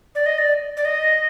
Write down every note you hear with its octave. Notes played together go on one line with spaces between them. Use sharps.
D5
D#5
D5
D5
D#5